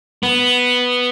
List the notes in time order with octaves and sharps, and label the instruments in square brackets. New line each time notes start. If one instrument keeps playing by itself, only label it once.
[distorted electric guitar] B3